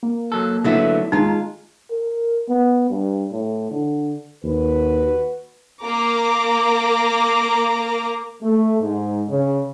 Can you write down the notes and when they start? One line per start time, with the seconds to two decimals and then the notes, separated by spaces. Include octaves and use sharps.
0.03 A#3
0.32 F#3 A4
0.64 D3 F#3 A3 B3 E4
1.12 D#2 G#3 D#4 F4 A#5
1.91 A#4
2.49 B3
2.90 G2
3.32 A2
3.71 D3
4.44 D#2 F#4 B4
5.84 A#3 A#5 D6
8.42 A3
8.80 G#2
9.28 C#3